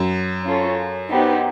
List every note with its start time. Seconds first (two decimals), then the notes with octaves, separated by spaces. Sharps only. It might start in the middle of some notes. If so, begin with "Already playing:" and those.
Already playing: F#2
0.44 C#4 F4 A4 C#5
1.09 B3 D#4 G4 C5